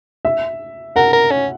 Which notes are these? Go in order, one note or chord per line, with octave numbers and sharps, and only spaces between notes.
E5
A#4 F#5
A#4
C#4